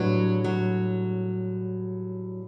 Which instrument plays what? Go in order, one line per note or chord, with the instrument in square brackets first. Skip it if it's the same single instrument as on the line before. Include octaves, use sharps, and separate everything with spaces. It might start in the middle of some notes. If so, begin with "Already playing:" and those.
Already playing: [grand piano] A2 G3 D4 G4 B4 [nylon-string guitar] F#3
[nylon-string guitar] F#3